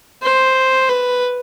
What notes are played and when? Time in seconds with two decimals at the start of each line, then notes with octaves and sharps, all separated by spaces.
0.23 C5
0.89 B4